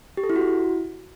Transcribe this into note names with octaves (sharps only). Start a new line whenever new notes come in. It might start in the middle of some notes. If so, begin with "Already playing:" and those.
G4
A4
E4
F#4
E4